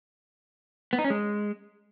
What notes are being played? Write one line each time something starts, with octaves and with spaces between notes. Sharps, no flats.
B3
D#4
C#4
G#3